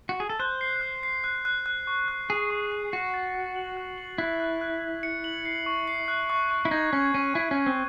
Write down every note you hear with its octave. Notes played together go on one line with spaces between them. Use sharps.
F#4
G#4
A4
C5 F#6
C7
F#6
C7
F#6
F#6
F#6
C#6
F#6
G#4 F#6
C#6
C7
F#4 C7
A6
F#6
F#7
F#6
F#7
E4 F#6
F#6
F#6
F#6
C#7
F#7
C7
C#6
C7
F#6
C#6
C#6
E4
D#4 G#6
C#4 G#6
C#4 D#7
E4 D#7
C#4
D#7
C4